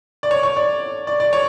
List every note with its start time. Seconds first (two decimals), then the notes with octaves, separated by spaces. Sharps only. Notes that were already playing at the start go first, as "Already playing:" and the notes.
0.23 D5
0.31 C#5
0.43 C#5
0.57 D5
1.07 D5
1.20 D5
1.33 C#5